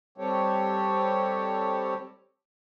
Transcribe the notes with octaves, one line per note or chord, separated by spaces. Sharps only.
G3 C4 G4 A4 C#5